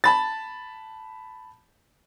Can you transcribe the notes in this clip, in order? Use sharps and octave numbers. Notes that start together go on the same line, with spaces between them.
A5 B5 A6